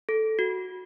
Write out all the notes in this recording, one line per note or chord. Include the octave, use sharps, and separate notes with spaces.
A4
F#4